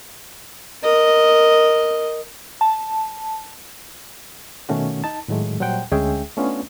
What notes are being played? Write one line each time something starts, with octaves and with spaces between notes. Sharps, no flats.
A#4 D#5
A5
B2 D#3 A3 C#4 F#4
D#4 A5
A2 D#3 F#3 G#3 A3
A#2 F#3 G3 C5 F#5 G5
D2 G#3 C#4 G#4 E5 G5
A3 B3 C#4 D4 F4